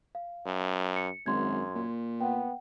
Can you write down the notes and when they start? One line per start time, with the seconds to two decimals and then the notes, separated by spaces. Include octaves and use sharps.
0.15 F5
0.46 F#2
0.96 C#7
1.26 G#1 F#2 C6 G#6
1.75 A#2
2.21 B3 F#5 G5